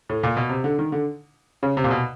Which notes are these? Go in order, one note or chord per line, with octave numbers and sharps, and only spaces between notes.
A2
A#2
B2
C3
D3
D#3
D3
C#3
C3
A#2
B2